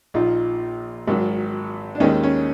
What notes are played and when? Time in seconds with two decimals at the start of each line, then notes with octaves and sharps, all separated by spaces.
0.14 A#1 A#2 F3 D#4 F4
1.07 G#1 G#2 D#3 F#3
1.95 D4
2.00 D#2 D#3 G#3 C#4 D#4
2.23 C#4